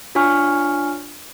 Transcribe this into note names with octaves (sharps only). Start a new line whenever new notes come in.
D4 F4 C#5 G#5 C#6 F6